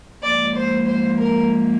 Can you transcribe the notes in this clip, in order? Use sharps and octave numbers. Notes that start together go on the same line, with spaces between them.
G#2 F3 A#3 D5
C5
C5
A#4